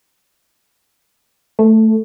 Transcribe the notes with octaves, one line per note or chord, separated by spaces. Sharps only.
A3